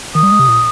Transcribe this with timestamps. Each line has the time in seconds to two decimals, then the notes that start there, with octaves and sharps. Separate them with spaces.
0.15 D#3 D#6
0.23 G3
0.32 G#3
0.39 C3
0.48 A#2